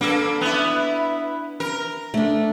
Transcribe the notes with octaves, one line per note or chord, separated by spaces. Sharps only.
A#3 D4 A4 B4
B3 E4
A#4
A3 D4